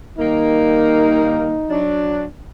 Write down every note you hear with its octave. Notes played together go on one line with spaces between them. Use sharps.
D#3 G3 A#3 D#4
F#3 D4